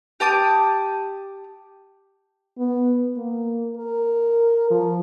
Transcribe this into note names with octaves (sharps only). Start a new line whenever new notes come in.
G4 A5 D6 D#6
B3
A#3
A#4
F3